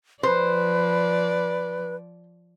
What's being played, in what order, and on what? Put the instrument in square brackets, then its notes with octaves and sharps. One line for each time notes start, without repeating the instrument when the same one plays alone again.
[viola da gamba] F3 D5 [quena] B4 [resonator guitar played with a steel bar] C5